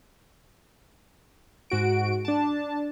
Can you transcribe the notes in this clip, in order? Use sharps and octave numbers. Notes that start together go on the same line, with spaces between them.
G#2 F#4 D7
D4 A5